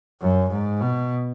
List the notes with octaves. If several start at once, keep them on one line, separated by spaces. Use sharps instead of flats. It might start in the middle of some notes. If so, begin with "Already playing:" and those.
F#2
G#2
B2